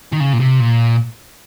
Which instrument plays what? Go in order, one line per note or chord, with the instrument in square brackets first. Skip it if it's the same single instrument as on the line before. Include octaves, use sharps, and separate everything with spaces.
[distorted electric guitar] D#3
C#3
A#2
C3
A#2